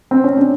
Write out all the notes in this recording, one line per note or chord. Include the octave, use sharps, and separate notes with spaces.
C4
C#4
D4